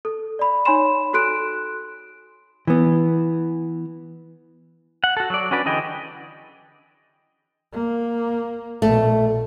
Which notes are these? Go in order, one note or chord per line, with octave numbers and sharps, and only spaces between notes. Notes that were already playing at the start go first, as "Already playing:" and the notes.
A4
D5 B5
D#4 C#5 G#5 B5 C6 E7
F#4 A4 C6 F#6 D7
E3 B3
F#5
F#4 A4
F#3 D5
C#4 D4 F#4 B4 D5
D3 E3 G#4 D#5 G5
A#3
A#1 B2 A3